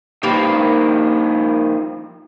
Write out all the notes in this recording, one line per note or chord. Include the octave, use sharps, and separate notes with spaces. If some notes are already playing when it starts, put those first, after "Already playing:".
D#3 F3 G3 A#3 B4